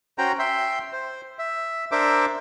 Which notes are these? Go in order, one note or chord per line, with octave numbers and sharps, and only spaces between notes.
C#4 F#4 C5 G5 A#5
E5 G5 C6
C5
E5
D4 A#4 C5 E5 D6